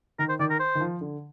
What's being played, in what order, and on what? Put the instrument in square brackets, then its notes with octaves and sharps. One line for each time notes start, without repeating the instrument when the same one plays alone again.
[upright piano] D#3 [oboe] A#4
[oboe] C5
[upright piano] D#3 [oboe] D5
[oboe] A#4
C5
[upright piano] D#3
F3
D3